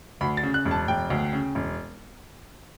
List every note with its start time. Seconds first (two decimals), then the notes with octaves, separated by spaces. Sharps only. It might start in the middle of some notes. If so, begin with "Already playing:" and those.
0.21 D2 B5
0.37 A6
0.43 C#3
0.54 F#6
0.65 E1
0.71 A5
0.88 E1 G5
1.10 D2
1.33 C#3
1.55 E1